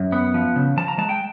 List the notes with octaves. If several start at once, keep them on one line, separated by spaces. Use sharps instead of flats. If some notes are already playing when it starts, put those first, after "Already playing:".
Already playing: F#2
B3
F3
C#3
F3 A5
A#5
G#3 A5
G5